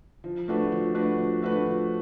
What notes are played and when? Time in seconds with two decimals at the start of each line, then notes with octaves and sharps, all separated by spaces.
0.24 F3
0.48 A3 D4 F#4 B4
0.72 F3
0.95 A3 D4 F#4 B4
1.18 F3
1.42 A3 D4 F#4 B4
1.66 F3